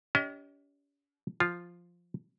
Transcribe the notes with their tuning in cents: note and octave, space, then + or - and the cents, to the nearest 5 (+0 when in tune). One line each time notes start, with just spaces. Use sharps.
C#4 +45 G4 -10 D#5 +30
F3 +0 F4 +0